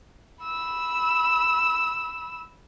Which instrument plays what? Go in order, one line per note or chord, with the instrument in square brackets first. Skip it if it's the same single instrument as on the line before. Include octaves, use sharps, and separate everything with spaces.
[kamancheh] B5 E6